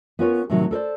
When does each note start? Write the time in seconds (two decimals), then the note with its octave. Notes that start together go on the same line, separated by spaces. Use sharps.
0.19 B3 C#4 F4 A#4 B4 C#5
0.50 A2 C3 D#3 F#3
0.71 A4 A#4 C5 D5